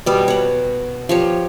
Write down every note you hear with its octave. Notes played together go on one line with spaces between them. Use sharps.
B2 G3 B3
C#5 F#5
F3 G4 C#5